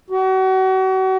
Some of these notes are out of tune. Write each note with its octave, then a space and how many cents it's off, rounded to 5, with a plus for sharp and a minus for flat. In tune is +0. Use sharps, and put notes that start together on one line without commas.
F#4 +35